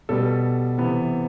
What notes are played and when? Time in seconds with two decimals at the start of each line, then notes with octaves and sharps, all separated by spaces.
0.09 B2 G3 B3 A4
0.78 C3 E3 B3